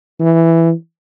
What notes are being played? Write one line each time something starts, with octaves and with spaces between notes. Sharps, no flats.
E3